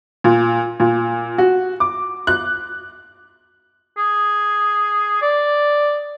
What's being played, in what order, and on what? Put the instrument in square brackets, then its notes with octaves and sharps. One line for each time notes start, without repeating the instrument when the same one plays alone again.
[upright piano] A#2
A#2
F#4
D6
F#6
[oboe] G#4
D5